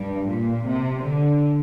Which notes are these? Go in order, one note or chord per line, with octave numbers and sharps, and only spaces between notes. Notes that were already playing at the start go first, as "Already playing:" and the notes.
Already playing: G2
A#2
C3
D3